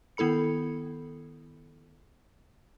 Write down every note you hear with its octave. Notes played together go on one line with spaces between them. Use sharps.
D#3 B3 E4 A4 B5 C#7